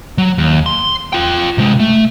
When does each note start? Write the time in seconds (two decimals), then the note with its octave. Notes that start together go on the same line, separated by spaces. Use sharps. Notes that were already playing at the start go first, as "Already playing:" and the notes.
0.18 F#3
0.38 D#2
0.66 C6
1.13 F4 G5
1.58 C3 G#3
1.80 A3